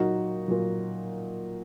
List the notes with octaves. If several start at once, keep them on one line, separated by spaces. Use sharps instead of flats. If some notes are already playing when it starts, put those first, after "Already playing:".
Already playing: A#2 F#3 D#4 F#4
A#2 F#3